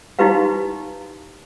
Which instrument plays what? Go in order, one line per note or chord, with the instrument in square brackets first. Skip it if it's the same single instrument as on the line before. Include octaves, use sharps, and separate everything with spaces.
[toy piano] D#4 E4 F#4 G4 B4 F5